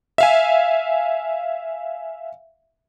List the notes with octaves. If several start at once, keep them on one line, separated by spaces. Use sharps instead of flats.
E5 F5 G#5